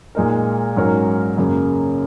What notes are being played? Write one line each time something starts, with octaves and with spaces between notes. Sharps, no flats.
A#2 G#3 D#4 A#4
G#2 F#3 C#4 A#4 C#5
F#2 C#3 A#3